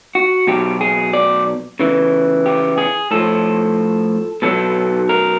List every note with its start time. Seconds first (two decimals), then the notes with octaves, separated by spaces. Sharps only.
0.15 F#4
0.47 B2 F#3 G4
0.81 G#4
1.13 D5
1.80 C#3 E3
2.46 G4
2.78 G#4
3.11 A2 F3 A4
4.42 B2 F#3 A4
5.09 A#4